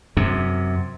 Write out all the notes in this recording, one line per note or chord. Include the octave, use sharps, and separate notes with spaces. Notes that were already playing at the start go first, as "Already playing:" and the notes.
F#2 C3